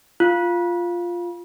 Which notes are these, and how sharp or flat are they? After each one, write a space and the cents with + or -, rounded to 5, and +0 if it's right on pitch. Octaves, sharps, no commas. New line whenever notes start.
F4 +0